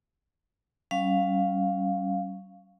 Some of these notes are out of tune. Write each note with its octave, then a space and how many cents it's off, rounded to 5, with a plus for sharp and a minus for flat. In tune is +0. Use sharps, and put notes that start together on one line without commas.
G3 -40 C#4 +0 F5 +0